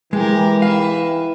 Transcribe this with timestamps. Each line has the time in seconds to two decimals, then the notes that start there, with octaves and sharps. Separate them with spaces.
0.13 E3 G#3 G4 A#4
0.62 B4 E5 F5